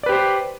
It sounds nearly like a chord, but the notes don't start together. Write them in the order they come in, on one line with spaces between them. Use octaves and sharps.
D5 B4 G4 C5